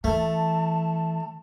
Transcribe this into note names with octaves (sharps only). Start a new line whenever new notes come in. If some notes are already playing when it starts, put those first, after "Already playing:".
E3 A3 A5